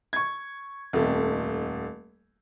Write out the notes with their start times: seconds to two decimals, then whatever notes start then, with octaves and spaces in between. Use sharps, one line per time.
0.13 C#6 G#6
0.93 D#1 F2 A3